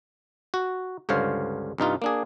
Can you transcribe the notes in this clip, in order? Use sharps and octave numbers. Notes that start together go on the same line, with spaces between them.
F#4
C#2 G2 D3 C5 C#5 F5
C2 G2 D#4 F4
A#3 D4 G#4